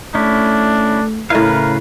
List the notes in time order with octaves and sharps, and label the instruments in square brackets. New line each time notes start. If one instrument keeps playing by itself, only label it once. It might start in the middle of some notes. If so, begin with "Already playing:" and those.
[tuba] A3 [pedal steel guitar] C#4 E4 [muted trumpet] D4
[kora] A2 E4 [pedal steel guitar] C#3 B4 F5 [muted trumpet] A#4